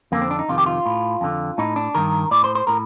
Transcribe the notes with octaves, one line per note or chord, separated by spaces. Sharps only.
F2 D3 A#3
C4
D4
D#4
F2 C3 D#3 F4
G4
F4
A2
F2 D3
A2 D#4
D4
G2 D#3 A#4
A2 D5
C5
C5
A2 A#4